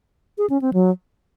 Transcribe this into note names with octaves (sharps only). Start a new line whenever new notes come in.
G#4
C#4
C4
F#3